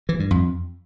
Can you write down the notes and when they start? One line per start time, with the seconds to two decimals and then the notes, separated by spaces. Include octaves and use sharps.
0.09 E3
0.20 G2
0.31 F2